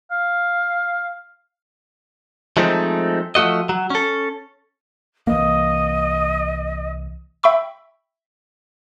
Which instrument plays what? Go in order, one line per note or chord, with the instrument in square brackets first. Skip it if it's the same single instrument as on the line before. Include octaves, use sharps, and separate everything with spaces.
[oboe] F5
[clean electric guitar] F3 G#3 A3 C4 D#4
F3 A3 F#4 D#5
F#3
C#4 A4
[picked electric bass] C2 E3 A#3 [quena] D#5
[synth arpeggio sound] E5 G5 B5 C#6 E6